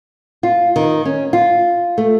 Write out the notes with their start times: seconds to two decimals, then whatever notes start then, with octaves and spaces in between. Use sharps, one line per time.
0.43 F4
0.76 D#3
1.05 C#4
1.33 F4
1.98 A3